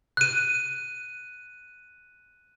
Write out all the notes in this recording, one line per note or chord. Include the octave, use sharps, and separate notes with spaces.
F#6 D#7